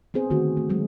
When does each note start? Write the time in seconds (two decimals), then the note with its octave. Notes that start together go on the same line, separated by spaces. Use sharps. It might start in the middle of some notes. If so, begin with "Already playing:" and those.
0.14 B3 C4 G#4 C5
0.30 D3 D#3 A3 F#4
0.57 A3
0.70 F#3 G#3